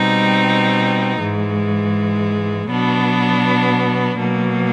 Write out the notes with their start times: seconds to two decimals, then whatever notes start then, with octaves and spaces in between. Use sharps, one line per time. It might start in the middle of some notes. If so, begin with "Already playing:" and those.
Already playing: B2 G3 C4 D#4
1.20 G#2 E3 G#3
2.69 B2 F#3 B3 D4
4.18 B2 F#3 A#3